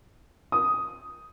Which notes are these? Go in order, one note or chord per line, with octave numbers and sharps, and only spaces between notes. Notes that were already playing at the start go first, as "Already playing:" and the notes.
D#6